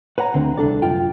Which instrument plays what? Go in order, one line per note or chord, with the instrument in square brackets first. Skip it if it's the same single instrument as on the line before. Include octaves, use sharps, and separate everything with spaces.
[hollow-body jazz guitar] B4 C#5 F#5 A#5
D2 D3 C4
C2 D4 A4 D5
F#2 F4 G5